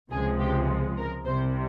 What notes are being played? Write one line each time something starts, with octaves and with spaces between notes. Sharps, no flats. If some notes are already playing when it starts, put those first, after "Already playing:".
C#2 C3 F3 G#3 G#4
G4
A#4
C2 C3 G3 C5